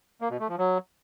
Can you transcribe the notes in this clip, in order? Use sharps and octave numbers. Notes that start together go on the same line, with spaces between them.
A#3
B2
A3
F3
F#3